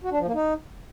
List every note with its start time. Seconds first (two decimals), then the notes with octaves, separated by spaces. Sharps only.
0.04 F#4
0.11 D4
0.19 F3
0.27 A#3
0.34 D#4